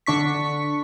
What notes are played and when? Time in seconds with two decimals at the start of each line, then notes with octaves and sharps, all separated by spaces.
0.06 D3 D4 C#6 B6